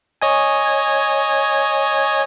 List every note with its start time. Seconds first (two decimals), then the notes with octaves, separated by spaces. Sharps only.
0.22 C#5 D#5 G#5